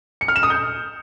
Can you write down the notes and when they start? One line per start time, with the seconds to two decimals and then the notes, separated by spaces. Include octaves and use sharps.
0.21 C#7
0.28 F6
0.36 E7
0.43 D#6
0.50 G6